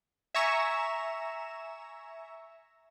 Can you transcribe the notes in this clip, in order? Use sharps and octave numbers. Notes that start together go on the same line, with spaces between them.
E5 G#5 A#5 C#6 E7